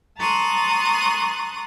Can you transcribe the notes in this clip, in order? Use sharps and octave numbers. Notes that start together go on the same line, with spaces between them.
A5 A#5 C6 C#6 D#6 F#6